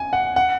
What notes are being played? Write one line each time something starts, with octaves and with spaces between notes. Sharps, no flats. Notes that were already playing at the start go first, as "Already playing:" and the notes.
Already playing: G#5
F#5
F#5